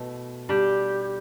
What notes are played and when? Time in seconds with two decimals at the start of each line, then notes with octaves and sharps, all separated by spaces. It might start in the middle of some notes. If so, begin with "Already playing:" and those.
Already playing: B2 A3 E4
0.49 G3 D4 G4